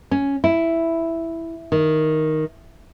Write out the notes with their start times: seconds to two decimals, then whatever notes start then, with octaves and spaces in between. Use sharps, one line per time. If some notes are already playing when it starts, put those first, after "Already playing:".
0.11 C#4
0.44 E4
1.72 D#3